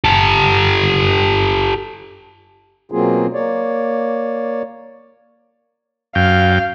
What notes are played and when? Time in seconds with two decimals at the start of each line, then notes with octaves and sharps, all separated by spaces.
0.04 G4 A4
2.92 B2 F#3 A#3 C4 F4 G#4
3.34 A#3 C#5 D5
6.15 F#2 F5 G5